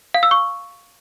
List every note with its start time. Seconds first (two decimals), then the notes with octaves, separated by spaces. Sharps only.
0.14 F5
0.23 E6
0.31 C#6